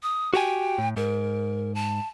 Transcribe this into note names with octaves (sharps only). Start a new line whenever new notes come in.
D#6
F#4 G4 G5 G#5
A2
G#2 A#4
A5